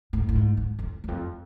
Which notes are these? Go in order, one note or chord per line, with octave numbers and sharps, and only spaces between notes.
A2
A2
G#2
G#2
F2
E2
F2